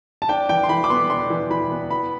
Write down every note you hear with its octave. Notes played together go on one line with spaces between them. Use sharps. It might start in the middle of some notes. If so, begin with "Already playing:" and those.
A5
D4 G5
E3 G5
C6
E3 B5
D6
B3 C6
D4 C6
E3
E3 B5
B3
B3 B5